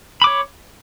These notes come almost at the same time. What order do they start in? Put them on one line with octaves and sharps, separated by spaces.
B5 D6 C#5